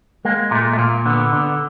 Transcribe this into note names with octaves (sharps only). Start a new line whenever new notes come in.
G#3 A#3
A#2 A3
A3
A#2 A#3
D3 B3
D3